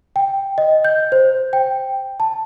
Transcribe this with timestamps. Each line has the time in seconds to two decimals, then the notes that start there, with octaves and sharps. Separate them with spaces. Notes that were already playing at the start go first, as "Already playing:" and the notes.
0.16 G5
0.58 D#5
0.85 G6
1.12 C5
1.53 G5
2.20 A5